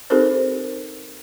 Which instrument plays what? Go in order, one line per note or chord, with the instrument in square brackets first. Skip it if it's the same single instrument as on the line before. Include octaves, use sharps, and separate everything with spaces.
[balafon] C4 D#4 G4 A4 A#4 C5